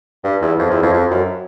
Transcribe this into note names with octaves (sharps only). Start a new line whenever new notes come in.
G2
E2
F2
E2
F2
F2
F#2